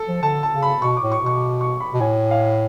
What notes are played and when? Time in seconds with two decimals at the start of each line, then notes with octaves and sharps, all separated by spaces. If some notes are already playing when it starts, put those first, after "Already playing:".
Already playing: A4
0.08 F3
0.22 D3 A5
0.43 A5
0.52 C#3
0.62 B5
0.82 B2 C#6
0.97 D6
1.02 A2
1.12 C#6
1.22 B2 C#6
1.61 C#6
1.80 B5
1.93 B2
2.00 A2 G#5
2.31 F5